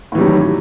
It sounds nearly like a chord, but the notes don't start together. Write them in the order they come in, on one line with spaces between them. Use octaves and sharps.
A2 E3 G3 F#3 D#3